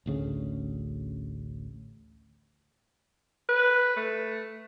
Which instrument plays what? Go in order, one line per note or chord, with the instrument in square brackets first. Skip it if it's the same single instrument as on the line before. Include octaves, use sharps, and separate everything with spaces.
[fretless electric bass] A1 D2 C#3
[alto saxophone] B4
A3